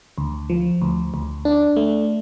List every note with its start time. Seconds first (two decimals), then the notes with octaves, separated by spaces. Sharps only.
0.18 D2
0.50 F3
0.82 D2
1.14 D2
1.45 D4
1.76 A3